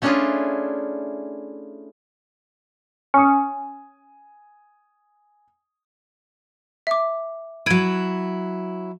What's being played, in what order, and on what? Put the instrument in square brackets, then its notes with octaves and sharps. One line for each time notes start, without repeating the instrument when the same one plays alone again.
[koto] A3 C#4 D4 E4 F4 G#4
[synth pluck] C#4 [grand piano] G#5 D#6
[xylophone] E5 D6
[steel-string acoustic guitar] F#3 E4 [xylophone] G#6 D7 D#7